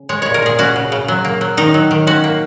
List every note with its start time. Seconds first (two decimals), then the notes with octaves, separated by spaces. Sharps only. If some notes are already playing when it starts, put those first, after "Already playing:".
Already playing: C#3
0.09 G#3 C#5
0.22 A#2 C#5
0.34 A#4
0.42 A#2 G#4
0.59 C#4 F#4
0.76 C#3
0.92 C#3
1.08 F#3
1.25 A#3
1.41 F#3
1.57 D#3 D#4
1.74 F#3
1.91 D#3
2.07 C#4 F#4
2.24 A#3